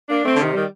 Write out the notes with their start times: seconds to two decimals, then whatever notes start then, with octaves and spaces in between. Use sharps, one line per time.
0.09 A#3 D4
0.24 A3 C4
0.34 D3
0.41 C3 D#3
0.53 D#3 G3